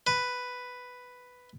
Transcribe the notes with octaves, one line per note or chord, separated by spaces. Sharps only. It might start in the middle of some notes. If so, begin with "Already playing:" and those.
B4